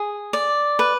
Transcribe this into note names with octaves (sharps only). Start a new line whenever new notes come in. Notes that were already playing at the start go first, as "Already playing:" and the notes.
Already playing: G#4
D5
B4